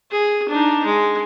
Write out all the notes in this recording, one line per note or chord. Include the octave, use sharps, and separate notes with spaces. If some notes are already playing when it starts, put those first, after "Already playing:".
G#4
D4 D#4
G#3